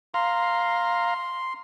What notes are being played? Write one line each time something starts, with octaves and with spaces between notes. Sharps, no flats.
F5 A#5 C6